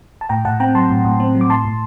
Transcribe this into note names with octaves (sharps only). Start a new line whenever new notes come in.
A5
A2 G5 A#5
A2 F#5 A5
C4 G5 A#5
F#3 A5 C6
A2
A2
C4
F#3
D6
A2 A5 C6
A2